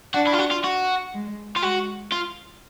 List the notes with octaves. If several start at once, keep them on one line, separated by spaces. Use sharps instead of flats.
D4 F#4
E4
F4
F#4
F4
F#4
G#3
F4
G#3 F#4
F4